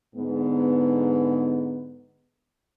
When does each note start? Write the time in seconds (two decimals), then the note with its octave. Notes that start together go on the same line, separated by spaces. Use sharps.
0.15 G#2 D3 G#3 B3